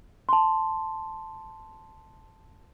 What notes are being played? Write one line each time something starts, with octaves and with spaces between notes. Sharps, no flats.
A5 C6